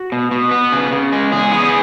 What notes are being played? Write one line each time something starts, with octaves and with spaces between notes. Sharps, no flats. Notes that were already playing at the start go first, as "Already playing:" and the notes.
Already playing: F#4
B2
B2
B3
C#3
C#3
G#3
E2 G#4
B3